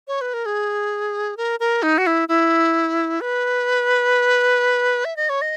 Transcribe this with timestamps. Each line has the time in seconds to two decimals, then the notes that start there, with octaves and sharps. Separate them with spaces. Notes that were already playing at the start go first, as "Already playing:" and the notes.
0.08 C#5
0.21 B4
0.34 A#4
0.46 G#4
1.37 A#4
1.60 A#4
1.83 D#4
1.98 F#4
2.07 E4
2.29 E4
3.21 B4
5.05 E5
5.16 D#5
5.30 C#5
5.42 D#5